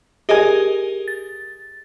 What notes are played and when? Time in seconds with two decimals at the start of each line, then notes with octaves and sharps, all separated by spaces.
0.29 G4 G#4 A#4 D#5 G#5
1.08 A6